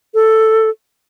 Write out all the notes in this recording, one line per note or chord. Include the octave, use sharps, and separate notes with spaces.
A4